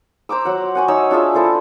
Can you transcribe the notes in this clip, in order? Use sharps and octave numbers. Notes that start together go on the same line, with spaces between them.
C5 A#5 D6 E6
F#3 F#5
F#5 G#5 C#6
D#4 C#5 E5 E6
D4 F4 G#4 E5
E4 A4 C5